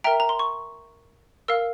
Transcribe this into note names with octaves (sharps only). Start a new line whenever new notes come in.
A#4 E5 G5 A#5
A#5
C6
C#6
A#4 F5 E6